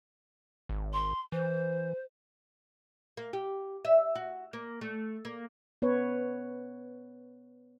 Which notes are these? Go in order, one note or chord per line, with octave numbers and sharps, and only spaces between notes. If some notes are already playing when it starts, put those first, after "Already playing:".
G#1
C6
E3 C5
A#3
G4
E5
F#4
A#3
A3
A#3
B3 B4 C#5